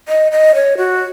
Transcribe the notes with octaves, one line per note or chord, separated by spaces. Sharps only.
D#5
D#5
C#5
F#4